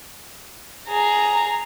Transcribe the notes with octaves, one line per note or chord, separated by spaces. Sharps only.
G#4 A#5